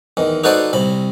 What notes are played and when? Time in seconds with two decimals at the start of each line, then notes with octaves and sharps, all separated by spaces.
0.17 E2 D#3
0.44 D#4 F#4 A4 B4 C5 D5
0.73 C2 C3 B5